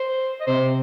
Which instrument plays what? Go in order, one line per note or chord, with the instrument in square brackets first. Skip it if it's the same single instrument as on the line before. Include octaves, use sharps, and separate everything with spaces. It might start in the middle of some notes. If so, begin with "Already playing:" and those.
Already playing: [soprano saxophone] C5
D#5
[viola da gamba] C3 [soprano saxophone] C5